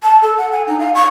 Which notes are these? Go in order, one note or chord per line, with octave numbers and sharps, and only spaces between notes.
A5
A4
F#5
G#5
D#4
F5
C#6